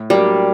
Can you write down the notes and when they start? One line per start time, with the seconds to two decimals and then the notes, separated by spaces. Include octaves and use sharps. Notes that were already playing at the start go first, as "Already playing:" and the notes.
Already playing: A2
0.10 F#3 G3 A#3 D4